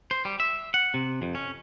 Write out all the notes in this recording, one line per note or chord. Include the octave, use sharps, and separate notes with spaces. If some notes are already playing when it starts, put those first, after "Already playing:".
C5
G3
E5
F#5
C3
F2
C#4